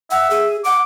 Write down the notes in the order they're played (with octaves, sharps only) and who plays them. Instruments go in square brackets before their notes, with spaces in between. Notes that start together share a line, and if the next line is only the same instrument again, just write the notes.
[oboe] E5 [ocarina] F#5
[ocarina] G#4
[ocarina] F#5 [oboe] D6